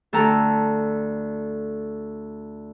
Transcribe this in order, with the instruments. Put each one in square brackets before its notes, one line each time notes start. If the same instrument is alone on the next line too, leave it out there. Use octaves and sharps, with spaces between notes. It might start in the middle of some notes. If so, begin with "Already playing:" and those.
[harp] D2 A4 G5 A#5